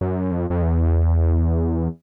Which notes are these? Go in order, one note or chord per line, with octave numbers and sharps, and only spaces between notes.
F#2
F2
F2
E2